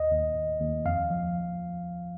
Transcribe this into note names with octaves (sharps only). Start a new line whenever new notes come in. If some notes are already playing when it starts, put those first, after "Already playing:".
Already playing: D#2 D#5
D#2
D#2
D#2
F2 F5
F3